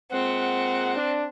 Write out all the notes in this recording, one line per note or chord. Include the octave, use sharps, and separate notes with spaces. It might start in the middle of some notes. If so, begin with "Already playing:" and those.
A#2 G#3 C4 F#5
D4